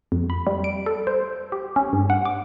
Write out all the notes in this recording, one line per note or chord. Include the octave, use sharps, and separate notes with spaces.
F2
B5
G3
D7
A4
C5
G4
C#4
G2
F#5
D6